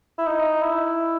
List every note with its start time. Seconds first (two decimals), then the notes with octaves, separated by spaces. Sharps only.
0.18 E4
0.26 D#4
0.61 E4